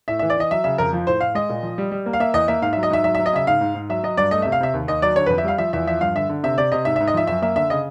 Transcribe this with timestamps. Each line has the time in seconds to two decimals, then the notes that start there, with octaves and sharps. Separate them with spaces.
0.08 A2 E5
0.19 E5
0.22 E3
0.30 D5
0.36 E3 D#5
0.51 F#3 E5
0.64 C#3 E5
0.78 F2 A#4
0.93 F3
1.07 A2 C5
1.21 A2 F5
1.35 G#3 D#5
1.49 A#2
1.63 F3
1.78 G3
1.92 G3
2.06 A#3
2.13 F5
2.20 A#3 E5
2.34 E2 D#5
2.48 A#3 E5
2.62 G#2 F5
2.73 E5
2.77 F#3
2.83 D#5
2.90 G#2 E5
3.04 F#3 E5
3.15 E5
3.19 F#3
3.26 D#5
3.33 C#3 E5
3.47 G#2 F5
3.61 G#2
3.75 G#2
3.89 F#3 E5
4.03 F#3 D#5
4.17 G2 D5
4.31 A3 D#5
4.42 E5
4.45 C3
4.52 F5
4.60 C3 E5
4.74 D#2
4.87 D#2 D#5
5.02 F#3 D5
5.16 D3 C#5
5.26 B4
5.30 F2
5.38 E5
5.44 G3 F5
5.58 F3 E5
5.73 E2 E5
5.87 F3 E5
6.01 G2 F5
6.15 D3 E5
6.29 D3
6.43 C3 E5
6.58 C3 D5
6.72 C3 D#5
6.85 G#2 E5
6.96 E5
7.00 G#2
7.07 D#5
7.14 F3 E5
7.27 F#2 E5
7.42 A#3 E5
7.56 D3 E5
7.70 C#3 D#5